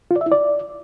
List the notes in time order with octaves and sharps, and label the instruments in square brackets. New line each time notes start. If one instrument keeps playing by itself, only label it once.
[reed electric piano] F4
D5
E5
E4
D5